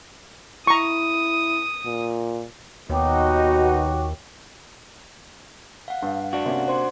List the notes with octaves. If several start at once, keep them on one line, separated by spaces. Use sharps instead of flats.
E4 A#5 C#6 D#6
A#2
D#2 B2 D#4 F#4 C#5 G5 D6
F5 F#5
G2
D4 F#4
C3 A#3 C#4
C5 D5 C6